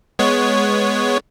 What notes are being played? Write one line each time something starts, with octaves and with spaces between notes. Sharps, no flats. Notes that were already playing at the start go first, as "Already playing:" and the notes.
G#3 B3 C#5